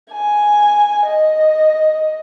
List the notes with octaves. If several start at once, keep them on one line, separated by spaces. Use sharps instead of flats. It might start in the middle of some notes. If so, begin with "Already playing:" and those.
G#5
D#5